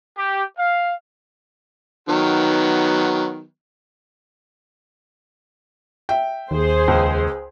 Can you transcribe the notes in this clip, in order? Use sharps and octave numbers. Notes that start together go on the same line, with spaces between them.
G4
F5
D#3 F#3 B3
E5 G5
D#2 G#4 C5
C#2